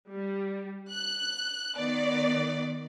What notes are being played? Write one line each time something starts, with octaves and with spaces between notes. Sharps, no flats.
G3
F#6
D#3 B3 D5